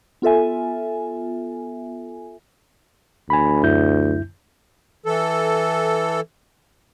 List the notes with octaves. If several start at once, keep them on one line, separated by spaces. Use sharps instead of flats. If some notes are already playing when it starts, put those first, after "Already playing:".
B3 F4 A4 E5 G#5
D2 G#5 B5
F#2 E4 G6
E3 A4